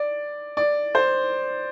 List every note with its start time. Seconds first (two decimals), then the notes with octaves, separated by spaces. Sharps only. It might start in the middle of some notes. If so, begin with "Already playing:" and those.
Already playing: D5
0.57 D5
0.95 C5